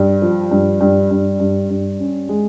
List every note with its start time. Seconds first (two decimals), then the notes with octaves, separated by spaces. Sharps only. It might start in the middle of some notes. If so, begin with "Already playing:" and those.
Already playing: G2
0.22 F3
0.51 G2
0.81 G2
1.11 G2
1.40 G2
1.70 G2
2.00 C#4
2.29 G#3